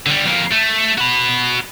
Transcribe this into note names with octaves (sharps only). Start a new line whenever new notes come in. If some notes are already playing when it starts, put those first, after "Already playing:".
D3 G3
F2 A#3
A3
F#4 B5